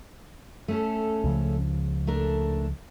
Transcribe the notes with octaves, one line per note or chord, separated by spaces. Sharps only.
A3 C#4 A4
C#2 C#3 F3
A3 D4 A#4